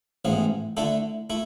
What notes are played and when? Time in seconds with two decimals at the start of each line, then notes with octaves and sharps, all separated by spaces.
0.25 A1 G#2 E3 B3
0.77 D3 A3 E4 A4
1.30 A3 E4